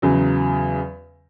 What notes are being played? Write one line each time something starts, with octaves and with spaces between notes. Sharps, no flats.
E2 C#3 F#3